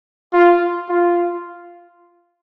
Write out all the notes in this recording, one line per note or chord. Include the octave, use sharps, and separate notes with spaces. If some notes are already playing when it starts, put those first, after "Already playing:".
F4
F4